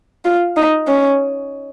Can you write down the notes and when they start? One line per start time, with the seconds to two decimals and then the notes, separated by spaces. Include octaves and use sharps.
0.25 F4
0.56 D#4
0.87 C#4